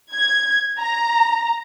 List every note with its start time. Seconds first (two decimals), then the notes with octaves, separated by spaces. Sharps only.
0.13 G#6
0.80 A#5